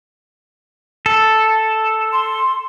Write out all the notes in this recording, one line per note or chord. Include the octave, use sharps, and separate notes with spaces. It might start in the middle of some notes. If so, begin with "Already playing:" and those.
A4
C6